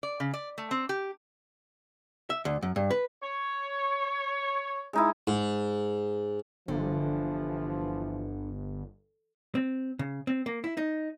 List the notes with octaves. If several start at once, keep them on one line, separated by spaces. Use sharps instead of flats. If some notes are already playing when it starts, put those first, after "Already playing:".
D5
C#3
D5
A3
C4
G4
E5
D2
F#2
G2
B4
C#5
G#3 D#4 E4
G#2
G1 D3 E3 F3
C4
C#3
C4
A#3
E4
D#4